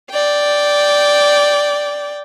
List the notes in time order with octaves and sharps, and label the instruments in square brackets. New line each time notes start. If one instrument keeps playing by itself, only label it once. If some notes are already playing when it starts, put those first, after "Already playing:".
[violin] D5 G5